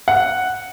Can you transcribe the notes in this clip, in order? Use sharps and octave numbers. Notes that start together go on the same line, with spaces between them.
F#5